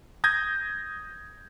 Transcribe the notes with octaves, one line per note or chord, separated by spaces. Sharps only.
D#6 G6 G#6 A#6